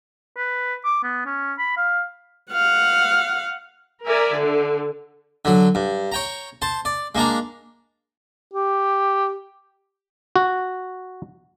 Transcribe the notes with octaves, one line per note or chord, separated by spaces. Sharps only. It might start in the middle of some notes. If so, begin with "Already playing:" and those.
B4
D6
B3
C#4
B5
F5
F5 F#5
A#4 D5 E5 G#5
D3
D3 F#3
G2
C#5 G5 A#5
C5 A5
D5
G#3 A#3 D4 A#5
G4
F#4